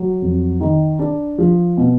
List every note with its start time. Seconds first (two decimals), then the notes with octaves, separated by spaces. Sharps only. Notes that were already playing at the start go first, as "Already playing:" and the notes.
Already playing: F#3
0.22 F2
0.60 D#3
0.99 D4
1.38 F3
1.77 B2